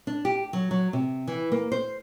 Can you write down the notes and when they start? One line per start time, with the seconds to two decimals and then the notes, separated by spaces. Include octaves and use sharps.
0.07 D4
0.25 G4
0.53 F#3
0.71 F#3
0.93 C3
1.27 E3
1.52 A#3
1.72 C5